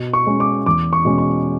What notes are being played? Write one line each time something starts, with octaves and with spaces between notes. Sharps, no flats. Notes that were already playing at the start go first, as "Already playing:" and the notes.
Already playing: B2
C#6
G#3 C#4
D6
E2 D6
C#6
B2 G#3 C#4
C#6